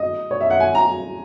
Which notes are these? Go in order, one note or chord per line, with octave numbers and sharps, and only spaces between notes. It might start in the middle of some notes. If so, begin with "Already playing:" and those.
Already playing: D#5
C#5
E5
F#5
G#5
A#5